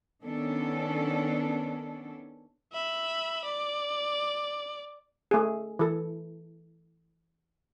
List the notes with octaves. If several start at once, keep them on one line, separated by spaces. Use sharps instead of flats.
D#3 B3 C#4 D4 A4
E5 B5
D5
A3 G#4
E3 A4